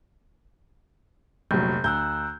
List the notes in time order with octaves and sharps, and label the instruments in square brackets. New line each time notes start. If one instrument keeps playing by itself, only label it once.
[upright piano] F1 [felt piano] A#1 F#3 [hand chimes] G6
[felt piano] D2 [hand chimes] A#5 E6 F#6 [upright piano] G6